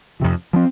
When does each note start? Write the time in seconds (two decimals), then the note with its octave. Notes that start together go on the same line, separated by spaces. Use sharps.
0.20 F2 C3 F3
0.53 F3 G#3 C4